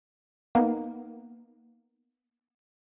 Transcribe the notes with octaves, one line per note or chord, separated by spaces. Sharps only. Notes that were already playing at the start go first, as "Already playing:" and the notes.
A#3 B3 D#4